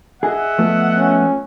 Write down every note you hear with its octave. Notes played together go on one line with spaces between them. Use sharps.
G#4 D#5 E5 F#5
F3 A3 B3
C#4